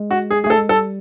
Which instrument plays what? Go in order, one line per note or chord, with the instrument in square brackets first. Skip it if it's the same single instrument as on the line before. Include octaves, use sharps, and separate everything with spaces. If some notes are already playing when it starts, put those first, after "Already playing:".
Already playing: [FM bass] G#3
[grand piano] F#4
G#4
G#4
[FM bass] A3 [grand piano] A4
[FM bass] G#3
[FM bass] G3 [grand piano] A4